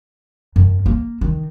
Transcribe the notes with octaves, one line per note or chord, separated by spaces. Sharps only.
F#2
A#3
D#3